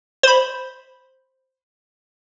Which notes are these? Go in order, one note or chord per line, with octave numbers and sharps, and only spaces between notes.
C5 B5